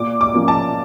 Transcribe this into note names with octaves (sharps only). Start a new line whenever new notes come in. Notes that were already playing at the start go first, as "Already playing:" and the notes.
Already playing: A#2 D6
D6
F3 A#3 C#4
A5